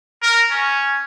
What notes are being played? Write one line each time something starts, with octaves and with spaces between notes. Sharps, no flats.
A#4
C#4